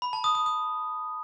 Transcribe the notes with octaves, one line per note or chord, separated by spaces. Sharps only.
B5
A5
D#6
D#6
D#6